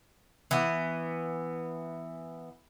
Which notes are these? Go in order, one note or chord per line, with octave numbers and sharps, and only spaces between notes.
E3 B3